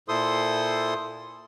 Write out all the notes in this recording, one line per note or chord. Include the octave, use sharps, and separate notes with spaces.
A#2 E4 A4 C5 C6 D#6